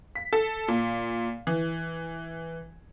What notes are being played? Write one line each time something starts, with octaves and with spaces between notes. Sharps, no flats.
B6
A4
A#2
E3